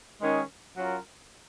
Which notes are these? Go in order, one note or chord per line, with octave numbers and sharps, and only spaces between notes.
D#3 G#3 C#4
F#3 C#4 F4 A#4